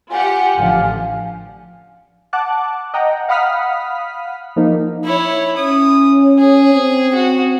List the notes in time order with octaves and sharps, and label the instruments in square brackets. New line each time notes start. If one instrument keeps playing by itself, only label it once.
[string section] F4 G4 F#5 [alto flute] G#5
[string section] A1 D3 F3 [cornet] F5
[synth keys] F#5 A5 D6 F#6
D#5 F#5 G5 A#5
F5 F#5 B5 D#6 F6 B6
F3 A#3 D#4
[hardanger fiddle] E4 C#5
[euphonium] C#4 [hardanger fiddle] D#6
[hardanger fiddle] G#4
[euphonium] C4
[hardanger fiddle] F#4